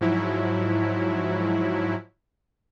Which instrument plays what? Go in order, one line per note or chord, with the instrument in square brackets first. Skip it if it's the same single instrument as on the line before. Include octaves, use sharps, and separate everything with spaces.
[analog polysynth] G#2 F3 F#3 E4